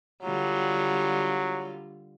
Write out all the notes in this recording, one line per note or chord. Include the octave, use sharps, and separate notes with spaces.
D3 F#3 G3 F4